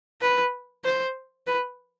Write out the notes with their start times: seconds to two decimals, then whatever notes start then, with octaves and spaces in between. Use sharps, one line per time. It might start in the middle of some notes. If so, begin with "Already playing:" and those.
0.21 B4
0.84 C5
1.47 B4